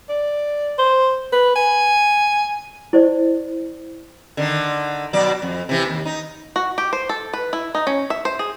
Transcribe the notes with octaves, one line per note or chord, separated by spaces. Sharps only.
D5
C5
B4
G#5
E4 C5 D5 D#5
D3 D#3
B2 F#3 D5
F2
C3 E3
D#2
D#4
F#4
G4
C5
A4
B4
E4
D#4
C#4
E5
C5
G#4